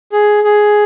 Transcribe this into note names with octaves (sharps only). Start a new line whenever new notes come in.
G#4
G#4